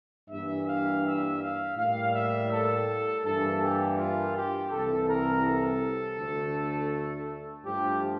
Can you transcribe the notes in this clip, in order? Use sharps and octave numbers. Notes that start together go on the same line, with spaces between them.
G2 E3 G3 A#3 E5
F5
E5
F5
A2 G3 A#3 F5
E5
A4
G2 E3 A#3 A4
G4
F4
G4
C2 C3 E3 A4
A#4
A4
D2 D3 A3
G2 F3 A3 G4